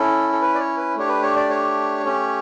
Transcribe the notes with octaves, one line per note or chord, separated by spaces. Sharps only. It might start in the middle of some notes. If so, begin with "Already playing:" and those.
Already playing: C#4 E4 A4
A4
B4
D5
C#5
B4
A3 D4 G4 C#5
B4
C#5
D5
C#5
A3 C#4 G4